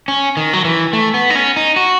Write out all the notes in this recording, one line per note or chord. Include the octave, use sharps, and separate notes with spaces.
C#4
D#3
F#3
E3
A3
B3
D#4
C#4
D#4
F#4